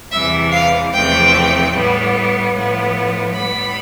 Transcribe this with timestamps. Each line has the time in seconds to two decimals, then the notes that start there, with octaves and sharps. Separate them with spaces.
0.12 E2 C3 E3 G3 E5
0.52 F5
0.92 E2 C3 F3 A3 C4 G5
1.72 A2 G3 B3
2.53 A2 F3 B3
3.33 A2 G3 B3 B5